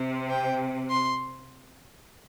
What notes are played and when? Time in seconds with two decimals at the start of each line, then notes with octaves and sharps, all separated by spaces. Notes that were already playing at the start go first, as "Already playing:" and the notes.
Already playing: C3
0.29 G5
0.90 C6